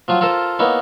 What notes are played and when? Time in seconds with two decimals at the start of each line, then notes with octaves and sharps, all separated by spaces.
0.08 F3 F#3 F4
0.21 F4 A4 A#4 C5 A5
0.59 A#3 B3 D#4 E4 C#5